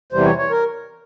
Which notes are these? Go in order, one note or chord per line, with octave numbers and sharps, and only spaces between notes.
E2 C3 E3 G3 C5
C#5
C#5
A#4